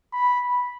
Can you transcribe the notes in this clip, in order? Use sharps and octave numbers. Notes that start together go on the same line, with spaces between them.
B5